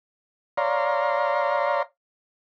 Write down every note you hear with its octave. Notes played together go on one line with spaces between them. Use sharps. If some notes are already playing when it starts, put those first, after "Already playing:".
C#5 D5 F5 A#5 C6